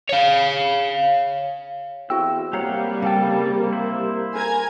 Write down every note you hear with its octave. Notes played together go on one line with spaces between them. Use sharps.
C#5 F5
E2 C4 E4 F#4 G5 E6
C3 G3 A#3 G4 C#5 F5 F#5 A#5
C#3 A4 F5 G5 A5
E4 C5
A#4 G#5 A#5 G#6